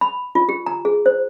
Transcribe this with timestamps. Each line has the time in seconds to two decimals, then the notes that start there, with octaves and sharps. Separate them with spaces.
0.01 B5
0.35 F4
0.49 G4
0.66 A#5
0.85 G#4
1.06 C5